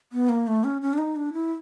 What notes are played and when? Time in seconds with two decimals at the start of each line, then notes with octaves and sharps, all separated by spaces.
0.13 B3
0.29 A#3
0.47 A3
0.64 C#4
0.82 C#4
0.93 D4
0.98 D#4
1.16 D4
1.33 E4